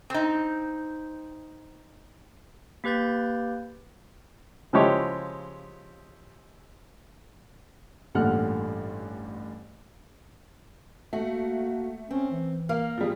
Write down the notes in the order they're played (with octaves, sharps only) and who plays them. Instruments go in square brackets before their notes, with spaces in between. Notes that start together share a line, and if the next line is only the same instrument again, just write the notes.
[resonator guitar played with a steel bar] C4 D#4
[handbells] A#3 G4 B4 G6 A6
[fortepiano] C#3 F3 G#3 E4 G4 C#5
[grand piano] A1 G2 A#2 D3 F#5 F6
[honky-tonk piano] A3 [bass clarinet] A#3 [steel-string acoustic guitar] F#4
[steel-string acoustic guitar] C4 [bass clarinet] C#4
[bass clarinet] E3
[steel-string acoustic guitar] A#3 [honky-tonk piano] F5
[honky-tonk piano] F3 G3 [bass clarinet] G#4